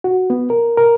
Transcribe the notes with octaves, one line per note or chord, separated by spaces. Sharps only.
F#4
B3
A#4
A#4